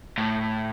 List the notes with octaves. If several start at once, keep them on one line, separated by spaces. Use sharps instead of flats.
A2